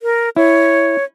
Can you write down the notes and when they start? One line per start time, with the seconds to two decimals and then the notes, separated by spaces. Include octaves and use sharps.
0.02 A#4
0.36 E4 C#5